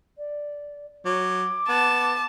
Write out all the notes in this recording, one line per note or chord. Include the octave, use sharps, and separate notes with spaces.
D5
F#3 D6
B3 A5